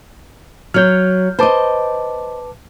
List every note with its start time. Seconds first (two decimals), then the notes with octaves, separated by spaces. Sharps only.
0.74 F#3 C#5 F6 G6
1.39 B4 C5 D#5 A5 D6